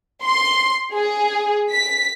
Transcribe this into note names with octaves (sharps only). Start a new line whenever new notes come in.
C6
G#4
B6